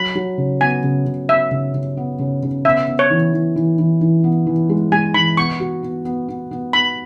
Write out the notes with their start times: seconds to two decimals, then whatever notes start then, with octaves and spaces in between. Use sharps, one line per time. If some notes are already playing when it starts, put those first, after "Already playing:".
Already playing: F#3 B5
0.15 F#3
0.38 C#3
0.61 B3 G#5
0.83 C#3
1.06 C#3
1.29 B3 E5
1.51 C#3
1.74 C#3
1.97 B3
2.19 C#3
2.43 C#3
2.65 B3 E5
2.88 B3
2.99 C#5
3.10 E3
3.33 E3
3.56 E3
3.79 E3
4.01 E3
4.24 B3
4.47 E3
4.69 G#3
4.92 G#3 G#5
5.14 E3 B5
5.37 B3 C#6
5.60 F#4
5.83 B3
6.05 B3
6.28 B3
6.51 B3
6.73 B3 B5